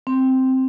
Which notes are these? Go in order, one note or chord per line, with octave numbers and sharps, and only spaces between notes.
C4